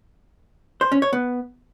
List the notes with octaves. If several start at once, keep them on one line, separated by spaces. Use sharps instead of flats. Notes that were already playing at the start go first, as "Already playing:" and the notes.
C5
C#4
C#5
B3